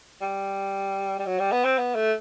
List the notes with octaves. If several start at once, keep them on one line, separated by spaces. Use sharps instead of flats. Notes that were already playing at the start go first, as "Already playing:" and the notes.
G3
G3
F#3
G3
B3
C4
B3
A3